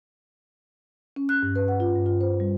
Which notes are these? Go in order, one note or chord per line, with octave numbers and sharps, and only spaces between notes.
C#4
F#6
G2
B4
F#5
F4
G2
F4
C5
G3